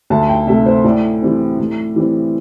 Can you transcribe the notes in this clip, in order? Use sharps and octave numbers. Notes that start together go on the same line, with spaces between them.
D2 A5
G5
C3 A3 E5
C5
A2 D5
E3 G3 C4
A2
E3 G3 C4